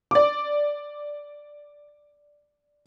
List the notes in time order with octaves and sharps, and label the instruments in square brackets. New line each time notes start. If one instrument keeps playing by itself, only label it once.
[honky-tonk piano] D5 D6